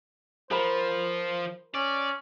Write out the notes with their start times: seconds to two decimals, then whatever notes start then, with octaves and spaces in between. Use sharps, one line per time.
0.51 F3 A#4 C5 B5
1.75 C#4 D5